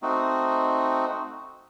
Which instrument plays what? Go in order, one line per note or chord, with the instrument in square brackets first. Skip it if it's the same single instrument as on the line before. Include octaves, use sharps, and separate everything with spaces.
[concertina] A3 C4 D#4 F#4